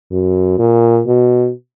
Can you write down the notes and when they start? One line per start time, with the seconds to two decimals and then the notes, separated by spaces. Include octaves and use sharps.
0.11 F#2
0.59 A#2
1.07 B2